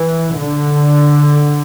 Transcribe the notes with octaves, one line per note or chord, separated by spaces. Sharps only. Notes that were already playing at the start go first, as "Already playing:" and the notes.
Already playing: E3
D3